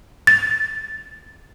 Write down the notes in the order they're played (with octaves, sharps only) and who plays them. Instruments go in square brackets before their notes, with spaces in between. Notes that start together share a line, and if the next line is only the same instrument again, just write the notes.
[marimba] A6